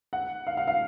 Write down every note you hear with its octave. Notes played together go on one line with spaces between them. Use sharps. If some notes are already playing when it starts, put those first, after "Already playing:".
F#5
F5
F5
F5